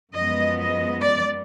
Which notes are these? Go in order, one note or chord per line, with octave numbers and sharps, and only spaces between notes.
F#2 F3 G#3 B3 D#5
D#5
D5